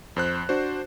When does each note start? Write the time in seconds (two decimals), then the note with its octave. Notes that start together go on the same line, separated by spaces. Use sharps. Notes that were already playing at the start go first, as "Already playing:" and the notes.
0.16 F2 C5 F#6
0.49 D4 F#4 C5